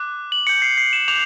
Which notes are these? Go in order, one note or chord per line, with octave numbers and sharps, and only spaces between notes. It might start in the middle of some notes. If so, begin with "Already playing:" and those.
Already playing: D6 F#6
F#7
D6 G6 C#7
C7
C7
E7
D6 G6 F7